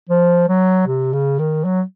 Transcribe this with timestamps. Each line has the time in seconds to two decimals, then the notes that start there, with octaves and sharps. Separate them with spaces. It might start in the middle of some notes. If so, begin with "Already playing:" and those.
0.09 F3
0.48 F#3
0.87 C3
1.13 C#3
1.39 D#3
1.64 F#3